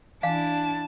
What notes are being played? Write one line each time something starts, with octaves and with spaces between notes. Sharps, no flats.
E3 D4 E4 F5 G#5 A5